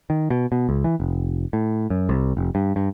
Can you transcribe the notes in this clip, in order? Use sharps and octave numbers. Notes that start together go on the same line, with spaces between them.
D#3
B2
B2
C#2
E3
F1
A2
F#2
C2
F1
G2
G2